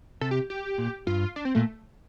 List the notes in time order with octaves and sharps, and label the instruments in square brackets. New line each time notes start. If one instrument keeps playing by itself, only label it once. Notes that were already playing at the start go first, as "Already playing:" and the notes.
[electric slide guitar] C3 [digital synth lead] A4
[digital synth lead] G4
G4
[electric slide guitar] A#2
[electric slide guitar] G2 [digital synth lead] F4
[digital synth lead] D4
C4
[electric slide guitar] A#2 [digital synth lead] A3